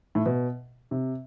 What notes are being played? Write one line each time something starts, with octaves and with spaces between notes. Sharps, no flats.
A2
B2
C3